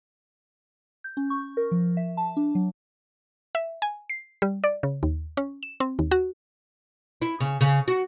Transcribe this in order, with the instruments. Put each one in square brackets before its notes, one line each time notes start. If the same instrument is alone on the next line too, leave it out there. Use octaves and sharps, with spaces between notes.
[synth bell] G6
C#4
C#6
A#4
F3
E5
A5
D4
F#3
[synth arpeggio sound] E5
G#5
C7
G3
D5
C#3
D#2
C#4
E7
C4
D#2
F#4
[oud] E4
C#3
C#3
F#4